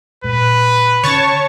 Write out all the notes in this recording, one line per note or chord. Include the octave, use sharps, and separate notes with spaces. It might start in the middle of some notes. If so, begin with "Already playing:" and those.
A#2 G#3 B4
D3 C#4 C#5 A5 C#6